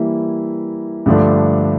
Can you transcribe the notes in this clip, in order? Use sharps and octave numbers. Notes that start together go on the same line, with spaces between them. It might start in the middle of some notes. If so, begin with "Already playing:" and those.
Already playing: E3 G3 A#3 E4
G2 D3 F3 A3 D4